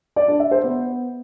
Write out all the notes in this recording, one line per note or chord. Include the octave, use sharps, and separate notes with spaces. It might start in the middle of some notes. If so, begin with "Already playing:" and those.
D5
D4
E5
C5
B3